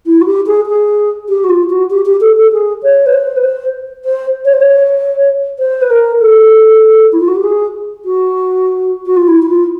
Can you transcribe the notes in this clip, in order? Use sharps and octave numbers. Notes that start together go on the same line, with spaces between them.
E4
F#4
G4
G#4
G#4
G4
F#4
F4
F#4
G4
G4
A4
A4
G#4
C#5
B4
C5
B4
C5
C5
C#5
C5
C#5
C5
B4
A#4
A4
E4
F4
F#4
G4
G#4
F#4
F#4
F4
E4
E4
F4